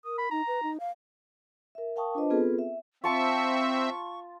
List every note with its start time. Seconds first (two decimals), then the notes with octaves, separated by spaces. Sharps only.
0.05 A#4 D#6
0.18 B5
0.31 D#4 A#5
0.47 B4
0.63 D#4
0.80 F5
1.75 A#4 E5
1.96 A#4 F5 G5 A5 C#6 D#6
2.15 D4 F4 B4 C5 D#5 A5
2.30 B3 C4 F4 G#4 A4 B4
2.59 E5
3.04 C4 F4 E5 A5 C6 C#6